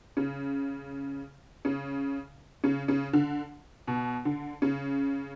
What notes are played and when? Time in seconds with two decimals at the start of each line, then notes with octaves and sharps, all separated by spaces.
0.17 C#3
1.65 C#3
2.64 C#3
2.88 C#3
3.13 D3
3.87 B2
4.25 D3
4.62 C#3